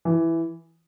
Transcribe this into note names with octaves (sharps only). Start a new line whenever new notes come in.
E3